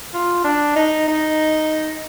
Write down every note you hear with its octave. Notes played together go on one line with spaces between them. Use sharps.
F4
D4
D#4
D#4